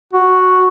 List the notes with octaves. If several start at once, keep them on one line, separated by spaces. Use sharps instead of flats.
F#4